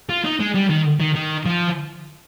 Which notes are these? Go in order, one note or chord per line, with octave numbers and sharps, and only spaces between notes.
F4
D#4
G#3
G3
D#3
D#3
D#3
F3